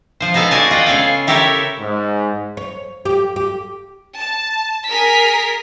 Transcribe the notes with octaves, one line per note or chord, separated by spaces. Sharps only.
F3 C5
B3 D#4 G#4 A4 F5
F#4 G#4 D5 G#5 A5
F4 D#5 F#5 G5
C#3 G#4 A4 F5
E4 G4 A4 A#4 C#5 E5
G#2
C#5
G4
G4
A5
G#4 A#4 B6